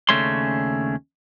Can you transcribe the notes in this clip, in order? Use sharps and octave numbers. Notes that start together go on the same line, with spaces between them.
D#2 C#3 A3 C#4 D4 C6